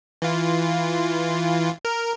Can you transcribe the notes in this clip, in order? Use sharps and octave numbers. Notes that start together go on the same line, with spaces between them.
E3 F4
A#4